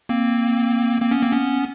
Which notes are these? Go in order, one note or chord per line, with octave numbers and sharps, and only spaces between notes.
A#3 C4
A#3 C4
B3 C#4
A#3 C4
B3 C#4